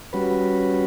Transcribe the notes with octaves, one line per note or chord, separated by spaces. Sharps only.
G3 C#4 F#4 B4